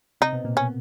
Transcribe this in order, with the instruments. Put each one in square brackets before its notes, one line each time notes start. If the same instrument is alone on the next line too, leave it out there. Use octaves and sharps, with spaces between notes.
[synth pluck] C3 C4 [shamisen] D#4
[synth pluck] B2 B3
A#2 A#3
[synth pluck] B2 B3 [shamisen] C#4